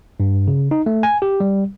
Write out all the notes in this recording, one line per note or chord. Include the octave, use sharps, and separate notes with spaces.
G2
C#3
D#4
A3
G#5
G4
G3